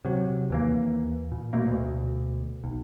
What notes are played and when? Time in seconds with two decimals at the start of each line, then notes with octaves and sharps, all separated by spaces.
0.05 C3 F#3
0.50 D#2 E3 A#3
1.32 A#2
1.53 B2 A3 A#3
1.66 D2 B2
2.64 B1